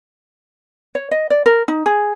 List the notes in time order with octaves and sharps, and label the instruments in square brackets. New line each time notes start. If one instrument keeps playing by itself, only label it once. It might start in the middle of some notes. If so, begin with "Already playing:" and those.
[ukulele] C#5
D#5
D5
A#4
D#4
G#4